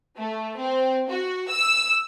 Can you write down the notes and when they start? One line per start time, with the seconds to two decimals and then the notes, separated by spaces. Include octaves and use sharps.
0.17 A3
0.58 C4
1.09 F#4
1.49 E6